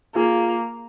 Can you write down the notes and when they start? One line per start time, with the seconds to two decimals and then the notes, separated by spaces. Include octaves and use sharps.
0.15 A#3 F4 G#4